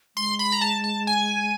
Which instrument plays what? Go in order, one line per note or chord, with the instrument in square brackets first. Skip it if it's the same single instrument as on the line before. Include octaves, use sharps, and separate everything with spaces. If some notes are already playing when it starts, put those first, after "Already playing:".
[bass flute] G#3 [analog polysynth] C6
[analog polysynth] B5
A#5
A5
A5
G#5